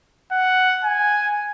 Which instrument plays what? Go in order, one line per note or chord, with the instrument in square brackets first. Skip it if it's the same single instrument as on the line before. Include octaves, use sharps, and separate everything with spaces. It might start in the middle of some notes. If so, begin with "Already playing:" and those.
[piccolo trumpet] F#5
G#5